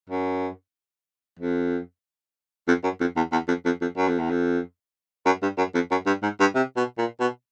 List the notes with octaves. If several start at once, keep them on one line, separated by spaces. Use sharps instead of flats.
F#2
F2
F2
F#2
F2
E2
E2
F2
F2
F2
F#2
F2
E2
F2
F#2
G2
F#2
F2
F#2
G2
G#2
G2
C3
B2
A#2
B2